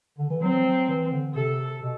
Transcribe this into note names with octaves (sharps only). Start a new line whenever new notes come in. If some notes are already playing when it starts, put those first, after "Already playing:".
D3
E3
F#3 C4
F#3
E3
D3
C3 A4
B2